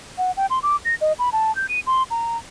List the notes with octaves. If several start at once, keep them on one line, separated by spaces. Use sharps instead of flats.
F#5
G5
C6
D6
A#6
D#5
B5
A5
G6
D#7
C6
A#5